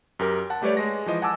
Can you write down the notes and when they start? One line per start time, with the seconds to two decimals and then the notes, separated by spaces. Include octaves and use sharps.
0.19 F#2 G4 A#4
0.50 F#5 A5
0.62 G3 A3 G4 B4 C#5 D5
0.77 G#3 A#6
1.06 E3 F3 D#5
1.22 F#5 G#5 A5 D6 E6